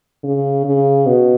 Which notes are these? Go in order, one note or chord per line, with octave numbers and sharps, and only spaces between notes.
C#3
C#3
B2